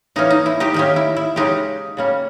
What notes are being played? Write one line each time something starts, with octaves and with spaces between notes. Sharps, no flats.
E3 A#3 C#4 D#4
D#4
E4
D#4 G4
D#3 A#3 C#4 D#4 G4
E4
E4
C#3 G#3 C#4 D#4 G4
C#3 G3 A#3 C#4